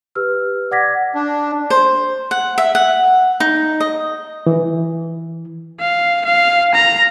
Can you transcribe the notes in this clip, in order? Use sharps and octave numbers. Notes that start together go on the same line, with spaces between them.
G4 B4 E6 F6
D5 F#5 D6 G#6 A#6 B6
D4
C5
F#5
E5
F#5
D#4
D#5
E3
F5
F5
A#5